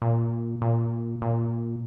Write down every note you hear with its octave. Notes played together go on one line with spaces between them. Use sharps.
A#2
A#2
A#2